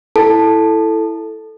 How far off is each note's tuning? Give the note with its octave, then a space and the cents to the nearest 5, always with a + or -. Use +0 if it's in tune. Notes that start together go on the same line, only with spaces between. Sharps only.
E4 +0 A4 +0 A5 +0